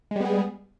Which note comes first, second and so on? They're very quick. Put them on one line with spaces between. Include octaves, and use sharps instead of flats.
G#3 G3 B3 G#4